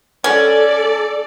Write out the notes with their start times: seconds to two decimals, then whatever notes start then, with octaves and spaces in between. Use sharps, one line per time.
0.24 C#4 A4 D5